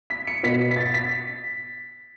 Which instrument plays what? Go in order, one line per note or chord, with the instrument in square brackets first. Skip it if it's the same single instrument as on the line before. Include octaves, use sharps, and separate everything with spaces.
[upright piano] B6
C#7
B2 B3 B6
B6
A6
B6